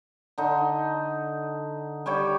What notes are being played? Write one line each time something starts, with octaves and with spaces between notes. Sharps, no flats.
D3 D#4
G3 G4 C#5 G5